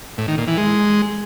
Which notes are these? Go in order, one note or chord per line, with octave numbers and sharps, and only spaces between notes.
A2
D#3
A#2
E3
G#3